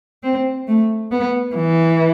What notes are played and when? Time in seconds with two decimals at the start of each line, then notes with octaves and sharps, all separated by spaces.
0.23 C4
0.68 A3
1.11 B3
1.55 E3